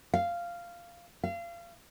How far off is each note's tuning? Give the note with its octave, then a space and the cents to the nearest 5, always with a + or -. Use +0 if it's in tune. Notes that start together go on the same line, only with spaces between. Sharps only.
F5 -10
F5 -30